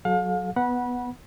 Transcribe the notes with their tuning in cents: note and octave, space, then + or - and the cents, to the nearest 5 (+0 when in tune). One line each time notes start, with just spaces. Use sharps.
F#3 +0 A4 -30 F5 +35
B3 +0 F#5 +0 B5 -25